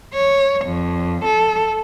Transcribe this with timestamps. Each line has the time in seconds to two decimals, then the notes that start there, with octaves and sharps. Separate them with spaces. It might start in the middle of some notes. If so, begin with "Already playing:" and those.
0.13 C#5
0.65 F2
1.25 A4